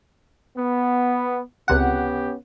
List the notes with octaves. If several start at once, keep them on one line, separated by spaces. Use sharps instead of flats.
B3
C#2 C3 B3 C#4 G4 F#5